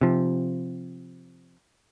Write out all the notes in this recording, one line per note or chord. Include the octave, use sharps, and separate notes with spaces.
C3 F3